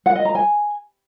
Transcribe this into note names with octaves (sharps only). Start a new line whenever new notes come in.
F#5
D#5
A#5
G#5